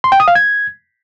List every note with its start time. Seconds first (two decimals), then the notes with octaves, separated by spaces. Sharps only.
0.04 C6
0.12 G5
0.20 D#6
0.28 F5
0.35 G#6